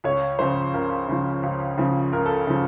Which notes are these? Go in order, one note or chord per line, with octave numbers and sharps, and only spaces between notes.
C#2 C#5
C#3 F3 C5
C#2 A#4
C#3 F3
C#2
C#3 F3
C#2 A#4
A4
C#3 F3